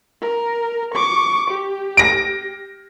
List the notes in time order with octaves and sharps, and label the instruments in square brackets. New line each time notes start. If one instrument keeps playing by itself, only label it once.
[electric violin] A#4
C#6 D6
G4
[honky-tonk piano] A#6 D7